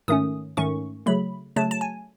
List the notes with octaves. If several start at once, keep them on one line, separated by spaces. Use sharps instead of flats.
G#2 D#3 A3 C#4 D#6
G#2 D#3 A3 C#4 C#6
C#3 F#3 A3 B5
C#3 F#3 A3 A5
A5
G#5